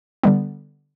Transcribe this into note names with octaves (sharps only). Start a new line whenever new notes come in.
D3 G3 B3